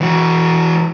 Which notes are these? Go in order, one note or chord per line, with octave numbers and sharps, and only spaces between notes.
E3 F#4